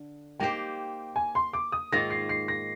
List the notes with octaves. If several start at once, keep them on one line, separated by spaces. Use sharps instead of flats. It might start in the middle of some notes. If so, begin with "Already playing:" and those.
Already playing: D3
A#3 D#4 G4 C5 G5
G#5
C6
D6
D#6
G#2 D#3 A#3 F4 A#6
C7
C7
A#6